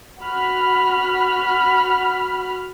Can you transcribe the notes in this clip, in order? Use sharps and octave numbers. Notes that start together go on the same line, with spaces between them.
F#4 B5 F6